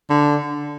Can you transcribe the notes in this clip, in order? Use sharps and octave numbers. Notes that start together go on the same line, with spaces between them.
D3